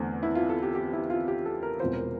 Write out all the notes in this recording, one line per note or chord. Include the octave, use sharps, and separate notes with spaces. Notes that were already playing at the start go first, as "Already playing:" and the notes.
Already playing: E2 D3 A3 C4
E4
F4
A4
G4
G4
E4
F4
G4
A4
A#4
E1 E2 C3 F3 C4 C5
A#4